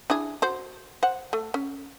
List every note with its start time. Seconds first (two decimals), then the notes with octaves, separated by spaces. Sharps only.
0.10 D4 E4 G#4
0.42 F#4 C5
1.03 C5 F#5
1.33 A3
1.54 C#4